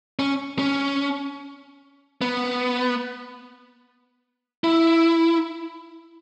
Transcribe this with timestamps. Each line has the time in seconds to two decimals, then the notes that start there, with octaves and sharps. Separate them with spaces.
0.19 C#4
0.59 C#4
2.21 B3
4.64 E4